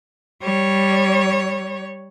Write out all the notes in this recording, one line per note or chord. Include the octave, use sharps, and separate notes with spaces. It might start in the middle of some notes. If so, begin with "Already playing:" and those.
G3 C#5